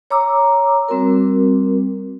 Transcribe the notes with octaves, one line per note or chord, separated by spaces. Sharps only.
C#5 A#5 D6 E6
G3 C4 F#4 A#4